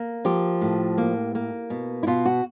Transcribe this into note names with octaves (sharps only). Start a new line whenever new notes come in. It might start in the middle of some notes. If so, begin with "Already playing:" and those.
Already playing: A#3
F3 G4
A2
A#3
A#3
B2
E4
B2 F4
F#4